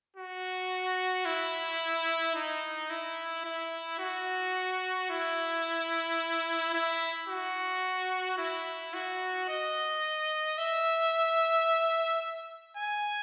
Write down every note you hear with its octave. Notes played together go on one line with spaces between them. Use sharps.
F#4
E4
D#4
E4
E4
F#4
E4
E4
F#4
E4
F#4
D#5
E5
G#5